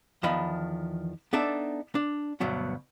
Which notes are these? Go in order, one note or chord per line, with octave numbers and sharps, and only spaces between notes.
E2 D#3 F3 D#5 B5
B3 D4 D#4 A4 D5 E5
D4
D2 G2 B2 F#3 B3